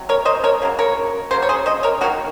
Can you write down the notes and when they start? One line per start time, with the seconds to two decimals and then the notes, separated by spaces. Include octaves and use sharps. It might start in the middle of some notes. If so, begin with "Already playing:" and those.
Already playing: C3 F#3
0.09 A#4 C#5
0.25 C5 D#5
0.44 A#4 C#5
0.62 C#3 F#3 A#3
0.79 A#4 C#5
1.31 C#3 F#3 A#3 C5
1.42 C#5
1.49 G#4 C5
1.66 C5 D#5
1.83 A#4 C#5
2.01 D#3 F#3 A#3 F#4 A#4